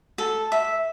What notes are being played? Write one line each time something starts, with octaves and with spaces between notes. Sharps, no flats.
A4
E5